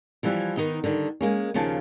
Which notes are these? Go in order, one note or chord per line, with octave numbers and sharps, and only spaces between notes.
E3 F3 G3 E4 B4
D#3 B3 D#4
D3 D#3 G3
G#3 A#3 C#4
D#2 C#3 F3 C#4 A5